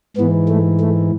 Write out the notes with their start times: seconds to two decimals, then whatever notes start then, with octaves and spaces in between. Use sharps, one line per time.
0.17 G#2 E3 B3
0.49 A3
0.80 A3